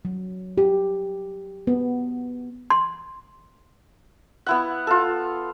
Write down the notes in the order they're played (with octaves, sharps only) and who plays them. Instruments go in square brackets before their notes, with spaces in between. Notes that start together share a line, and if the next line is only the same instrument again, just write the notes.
[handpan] F#3
G4
B3
[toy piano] C6
[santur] B3 E4 F#5
F4 A4